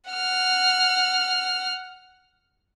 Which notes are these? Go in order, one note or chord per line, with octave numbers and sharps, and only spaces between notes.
F#5 F6